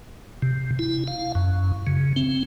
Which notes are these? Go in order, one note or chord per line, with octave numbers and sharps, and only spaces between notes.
C3
E4
F5
F#2
C#3
C4